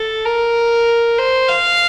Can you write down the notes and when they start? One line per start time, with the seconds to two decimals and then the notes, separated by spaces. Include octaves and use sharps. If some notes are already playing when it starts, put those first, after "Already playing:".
Already playing: A4
0.25 A#4
1.18 C5
1.48 F5